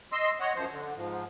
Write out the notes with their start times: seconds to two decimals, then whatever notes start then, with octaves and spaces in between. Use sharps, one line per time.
0.12 D#5 C6 E6
0.40 C#5 D#5 F#5
0.55 F#2 F3 C5
0.71 D3
0.96 G#2 F3